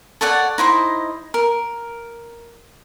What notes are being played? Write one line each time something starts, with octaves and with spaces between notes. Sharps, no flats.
A4 C#5 D5 F#5
D#4 E4 C5 D#5
A#4